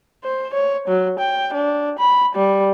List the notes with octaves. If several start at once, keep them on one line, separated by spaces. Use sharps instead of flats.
C5
C#5
F#3
G5
D4
B5
G3